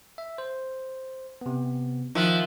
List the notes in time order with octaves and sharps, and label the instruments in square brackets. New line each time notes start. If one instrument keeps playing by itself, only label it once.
[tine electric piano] E5
C5
C3 B3
[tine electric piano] D#3 E5 F#6 [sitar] F3